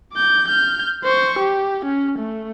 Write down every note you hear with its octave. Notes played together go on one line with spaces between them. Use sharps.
D6 G6
F6 G6
C5 C#6
G4
C#4
A3